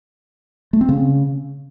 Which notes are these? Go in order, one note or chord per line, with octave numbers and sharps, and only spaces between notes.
A3
C4
C#3